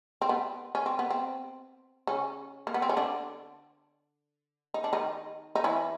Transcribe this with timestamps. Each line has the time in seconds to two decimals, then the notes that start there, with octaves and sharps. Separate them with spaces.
0.22 C4
0.29 B3
0.75 C#4
0.86 C4
0.99 B3
1.10 C4
2.07 C#3 C#4
2.67 A#3
2.74 B3
2.82 C4
2.89 C#4
2.97 D3 D4
4.74 D#4
4.84 D4
4.93 D#3 D#4
5.55 D#4
5.64 E3 E4